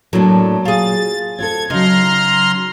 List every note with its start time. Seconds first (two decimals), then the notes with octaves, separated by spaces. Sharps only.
0.13 A2 F#3 A#3 D4
0.65 F4 G#4 A6
1.39 C4 F4 A4 G#6
1.70 C#3 F#3 D#4 A#5 C6 F6